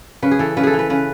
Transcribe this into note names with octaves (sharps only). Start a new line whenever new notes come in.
C#3 B4
G#4
E3 A4
C#3 B4
G#4 A4
E3
B4
C#3 B4